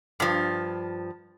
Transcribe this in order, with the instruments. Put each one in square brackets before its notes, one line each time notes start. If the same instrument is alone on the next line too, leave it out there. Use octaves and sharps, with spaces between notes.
[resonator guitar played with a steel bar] G2 F3